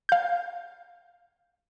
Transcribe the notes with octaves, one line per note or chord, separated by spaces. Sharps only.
F5 G6